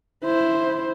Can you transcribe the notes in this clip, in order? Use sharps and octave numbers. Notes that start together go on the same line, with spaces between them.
E4 C5